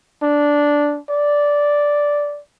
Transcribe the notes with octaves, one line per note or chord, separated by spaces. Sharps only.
D4
D5